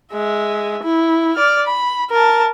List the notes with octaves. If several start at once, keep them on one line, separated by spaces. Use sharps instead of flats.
G#3 E5
E4
D5 F6
B5
A#4 A5